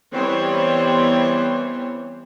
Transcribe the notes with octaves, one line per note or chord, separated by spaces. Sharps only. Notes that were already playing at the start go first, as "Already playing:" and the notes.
E3 G3 B3 C4 C5 C#5